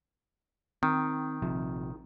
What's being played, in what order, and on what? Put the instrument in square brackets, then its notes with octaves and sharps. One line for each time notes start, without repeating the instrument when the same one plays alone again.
[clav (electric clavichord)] D#3 [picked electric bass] C4
[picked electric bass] A#1 C3 F3